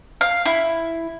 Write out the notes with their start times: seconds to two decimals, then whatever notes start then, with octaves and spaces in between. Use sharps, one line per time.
0.21 F5
0.45 E4